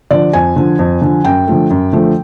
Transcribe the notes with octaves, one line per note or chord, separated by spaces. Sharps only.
D3 F3 D5
F2 G#5
D3 F3
F2
D3 F3
F#2 G5
D3 F3 A3
F#2
D3 F3 A3